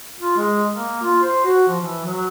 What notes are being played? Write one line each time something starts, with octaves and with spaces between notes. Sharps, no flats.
F4
G#3
A#3
F4
C5
F#4
F3
E3
F#3